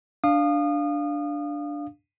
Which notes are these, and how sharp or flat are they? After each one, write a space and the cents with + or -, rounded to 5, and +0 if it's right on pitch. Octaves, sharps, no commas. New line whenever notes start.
D4 +0 F5 +0 D#6 -30